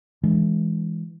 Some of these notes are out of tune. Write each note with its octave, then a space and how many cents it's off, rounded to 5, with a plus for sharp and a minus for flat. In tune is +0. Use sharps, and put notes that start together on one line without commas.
E3 +0 G#3 +0 D4 +0